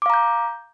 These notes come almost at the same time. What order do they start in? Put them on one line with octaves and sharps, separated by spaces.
D6 F5 A#5 G6